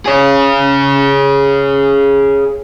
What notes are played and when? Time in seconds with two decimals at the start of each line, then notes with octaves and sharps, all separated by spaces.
0.06 G#4 C#5